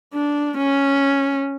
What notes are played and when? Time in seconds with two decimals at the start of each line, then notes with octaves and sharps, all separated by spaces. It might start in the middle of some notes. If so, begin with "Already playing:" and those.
0.14 D4
0.58 C#4